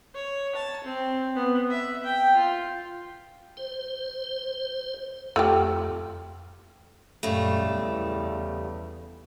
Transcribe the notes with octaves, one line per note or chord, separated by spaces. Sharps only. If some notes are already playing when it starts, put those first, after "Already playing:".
C#5
A5
C4
B3
E5
G5
F4
C5
F2 A3 F4 G4
F#2 A#2 C#3 G3 A3
E2